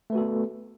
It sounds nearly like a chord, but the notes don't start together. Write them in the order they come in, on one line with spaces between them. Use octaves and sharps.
A3 B4 F#4 A4 B3